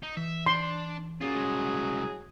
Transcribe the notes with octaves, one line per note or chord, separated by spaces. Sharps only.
D#4
E3 E5
D4 C6
F#3 A#3 C#4 F4 G#4
C2 G#3